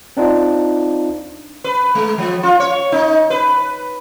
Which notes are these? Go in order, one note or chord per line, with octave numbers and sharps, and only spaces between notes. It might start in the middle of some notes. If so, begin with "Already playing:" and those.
C4 D4 D#4 F4
B4
G#3
F3
F4
C#5
D#4
B4